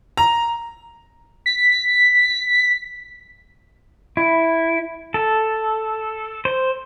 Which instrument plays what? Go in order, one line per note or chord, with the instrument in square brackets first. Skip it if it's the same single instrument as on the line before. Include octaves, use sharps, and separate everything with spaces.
[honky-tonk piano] A#5
[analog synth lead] B6
[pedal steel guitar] E4
A4
C5